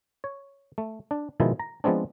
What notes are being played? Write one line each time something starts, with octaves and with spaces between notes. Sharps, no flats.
C#5
A3
D4
B2 D#3 F3 G#3 D#4 E4
A#5
F3 G#3 B3 C4 D4